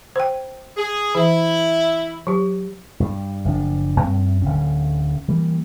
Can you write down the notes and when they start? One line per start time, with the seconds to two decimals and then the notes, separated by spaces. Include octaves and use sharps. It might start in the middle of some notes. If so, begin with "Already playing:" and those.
0.16 C5 G5
0.77 G#4
1.15 E3 E4
2.27 F#3 G4
3.00 G2 G3
3.45 F#1 F3 D4
4.00 F#2 C4
4.42 D1 D3 C#4
5.28 E3 G3 A#3